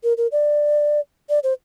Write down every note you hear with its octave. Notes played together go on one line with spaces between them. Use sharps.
A#4
A#4
D5
D5
C5